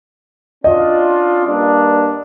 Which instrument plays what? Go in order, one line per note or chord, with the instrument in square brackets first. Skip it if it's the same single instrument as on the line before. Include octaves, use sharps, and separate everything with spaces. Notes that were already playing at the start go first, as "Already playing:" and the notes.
[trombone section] C#4 D4 F4 [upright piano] D#5
[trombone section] G2 A#3 D4